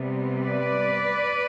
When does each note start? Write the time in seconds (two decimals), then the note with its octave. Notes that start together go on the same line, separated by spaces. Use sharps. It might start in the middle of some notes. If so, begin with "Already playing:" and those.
Already playing: C3 G3 B3
0.45 B4 D5